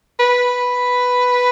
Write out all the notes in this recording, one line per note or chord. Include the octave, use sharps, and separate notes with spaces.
B4